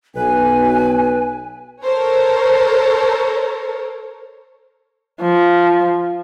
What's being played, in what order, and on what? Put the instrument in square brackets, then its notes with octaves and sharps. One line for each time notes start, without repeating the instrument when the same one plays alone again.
[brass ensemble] B1 [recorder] B4 [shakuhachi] G#5
[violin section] A4 A#4 C5 C#5
[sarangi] F3